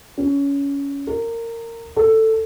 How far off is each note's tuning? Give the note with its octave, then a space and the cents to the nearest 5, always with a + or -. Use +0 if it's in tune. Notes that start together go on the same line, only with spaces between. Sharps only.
C#4 +20
A#4 -20
A4 +10